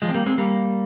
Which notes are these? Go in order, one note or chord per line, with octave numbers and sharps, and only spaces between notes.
F3 G#3
C4
G3 A#3
G#3 C4
G3 A#3